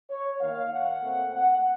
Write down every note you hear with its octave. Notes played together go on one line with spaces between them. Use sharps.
C#5
D#3 A#3 F5
F#5
A#2 A3 C4
F#5